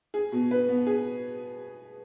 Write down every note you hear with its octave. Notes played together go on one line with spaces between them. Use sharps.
G#4
B2
B4
B3
G#4